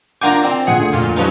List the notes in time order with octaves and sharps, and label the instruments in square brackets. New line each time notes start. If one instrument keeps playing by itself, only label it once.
[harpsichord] A#3 F4 G#5 [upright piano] D4 F#5 G6 [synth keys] A#5 D6
[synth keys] C4 [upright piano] D5 G5
[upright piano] A#2 F#5 C#7 [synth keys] G#4
[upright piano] D2
[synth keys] F2 A#2 F4
[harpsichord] G2 F3 B3 [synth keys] F#3 C#4 D#4